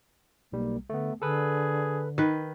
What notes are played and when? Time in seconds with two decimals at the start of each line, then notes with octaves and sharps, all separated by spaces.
0.52 B1 G3 A#3
0.90 D3 A3 B3
1.22 D3 G#4 A4 B4
2.18 D#3 B4